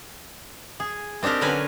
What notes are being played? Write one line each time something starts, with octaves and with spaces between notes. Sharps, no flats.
G#4
C4 D4 D#4 G4 A#4
D3 F#3 C#4 A#4 B4 G#5